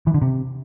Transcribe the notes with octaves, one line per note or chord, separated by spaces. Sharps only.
E3
D3
C3